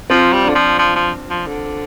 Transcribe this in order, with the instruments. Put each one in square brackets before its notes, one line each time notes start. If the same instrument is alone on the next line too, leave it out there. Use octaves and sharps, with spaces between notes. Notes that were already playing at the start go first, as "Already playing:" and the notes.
[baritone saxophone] F3 [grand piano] C4 F4
[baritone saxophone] G3
[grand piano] D4
[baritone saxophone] D3
F3
F3
F3
F3
D3